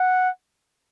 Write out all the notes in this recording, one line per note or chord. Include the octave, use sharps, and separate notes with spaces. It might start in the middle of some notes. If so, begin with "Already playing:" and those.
Already playing: F#5